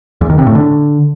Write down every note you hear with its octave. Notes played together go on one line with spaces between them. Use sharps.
E2
D#3
C3
A2
D3